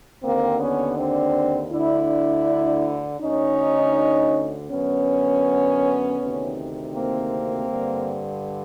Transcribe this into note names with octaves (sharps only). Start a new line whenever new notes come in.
D#2 D3 A#3 C4
B3 C#4
C4 D4
D2 D3 D4 E4
D2 D3 C#4 D#4
F#2 D3 B3 C#4
D2 C3 D#3
A#3 C4
G2 D3